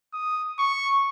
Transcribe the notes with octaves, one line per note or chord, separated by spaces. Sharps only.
D#6
C#6